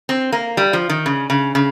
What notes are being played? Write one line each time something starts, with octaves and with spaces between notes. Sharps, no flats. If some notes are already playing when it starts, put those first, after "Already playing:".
C4
A#3
G3
F3
D#3
C#3
C#3
C#3